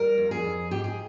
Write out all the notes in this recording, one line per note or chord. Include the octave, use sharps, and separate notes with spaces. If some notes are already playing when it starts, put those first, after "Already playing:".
Already playing: G3 A#4
F2
G#4
F2
G#2 G4
G#4